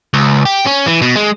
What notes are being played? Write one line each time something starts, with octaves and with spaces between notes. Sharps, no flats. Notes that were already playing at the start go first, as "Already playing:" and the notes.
C#2
G4
C#4
E3
B2
G#3